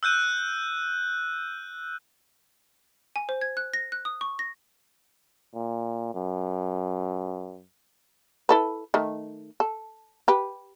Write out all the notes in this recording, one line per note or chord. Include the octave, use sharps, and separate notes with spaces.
E6 F#6 G6 D#7
G#5
C5
G#6
F#6
A#6
F#6
D#6
C#6
A#6
A#2
F#2
E4 A4 B4
D#3 A3
A4
G4 B4